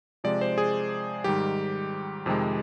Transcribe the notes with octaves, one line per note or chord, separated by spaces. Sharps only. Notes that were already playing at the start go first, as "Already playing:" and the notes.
C3 F3 G#3 D5
C5
G#4
G#2 D#3 G3 G4
F2 C3 D#3 G#3